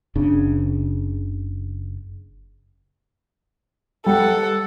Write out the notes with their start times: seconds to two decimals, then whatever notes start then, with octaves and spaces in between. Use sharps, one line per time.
0.15 F#1 C#3 D4
4.06 G3 G4 A4 F#5